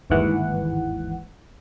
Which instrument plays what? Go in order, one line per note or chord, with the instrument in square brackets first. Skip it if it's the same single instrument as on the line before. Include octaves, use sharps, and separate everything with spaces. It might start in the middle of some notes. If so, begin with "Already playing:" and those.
[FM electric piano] G1 D#2 G#2 E3 F#5